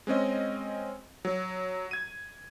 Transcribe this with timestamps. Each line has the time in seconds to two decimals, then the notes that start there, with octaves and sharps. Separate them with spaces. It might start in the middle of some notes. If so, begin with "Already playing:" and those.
0.07 G#3 C4 C#4 D#5
1.25 F#3
1.91 G#6 D#7